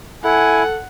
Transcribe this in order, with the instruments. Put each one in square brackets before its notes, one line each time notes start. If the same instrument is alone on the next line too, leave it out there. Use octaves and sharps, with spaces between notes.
[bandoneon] E4 [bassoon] A4 [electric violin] F#5 [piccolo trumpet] G#5